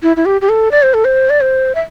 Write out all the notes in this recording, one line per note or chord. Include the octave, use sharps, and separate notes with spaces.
E4
E4
G4
G4
A4
D5
C5
A4
C5
D5
C5
E5